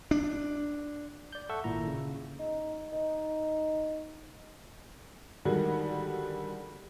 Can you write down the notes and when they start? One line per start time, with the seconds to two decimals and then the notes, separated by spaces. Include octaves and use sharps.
0.11 D4
1.33 D5 G6
1.49 A4 E5 F#5 C#6 E6
1.64 G#1 A#2 E4 A#5
1.87 C#3
2.40 D#4
2.93 D#4
5.45 D3 D#3 G3 G#3 F#4